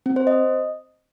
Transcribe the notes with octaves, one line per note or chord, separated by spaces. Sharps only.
C4
C5
D#5